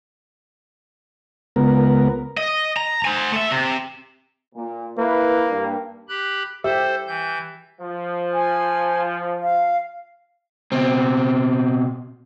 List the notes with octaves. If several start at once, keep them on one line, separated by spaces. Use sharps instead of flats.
C#2 B3 A#4
D#5
A#5
C5 G#5
A3 E5
C3
A#2
A#3 E4 B4
G2
G4 B5 F#6
G4 A4 C5 E5
E3 G6
F3
G#5
F5
B2 C4